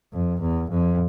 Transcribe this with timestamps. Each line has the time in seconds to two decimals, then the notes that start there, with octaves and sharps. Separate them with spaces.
0.14 F2
0.41 E2
0.70 F2